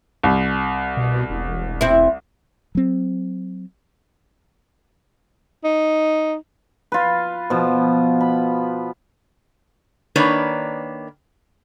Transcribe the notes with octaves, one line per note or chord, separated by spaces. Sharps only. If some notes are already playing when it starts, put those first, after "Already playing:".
C2
B2
E1
C4 E4
F#3 C4
D#4
F4 B4
B2 F3
B5
D#3 A#3 D4 B4 C#5